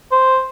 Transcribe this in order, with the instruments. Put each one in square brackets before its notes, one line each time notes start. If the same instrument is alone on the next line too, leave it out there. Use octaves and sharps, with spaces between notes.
[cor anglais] C5